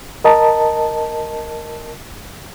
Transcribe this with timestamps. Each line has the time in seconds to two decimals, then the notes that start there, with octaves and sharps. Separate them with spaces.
0.24 A#4 D#5 A5 A#5